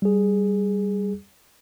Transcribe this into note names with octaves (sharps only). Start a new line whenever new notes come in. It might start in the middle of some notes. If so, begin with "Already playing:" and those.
G3 G#4